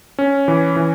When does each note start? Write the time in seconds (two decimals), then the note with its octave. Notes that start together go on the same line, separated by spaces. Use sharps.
0.19 C#4
0.48 E3
0.76 E3